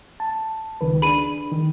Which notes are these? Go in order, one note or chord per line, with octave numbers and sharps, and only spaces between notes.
A5
C#2 D#3 B4
D4 G#4 B5 D#7
D#3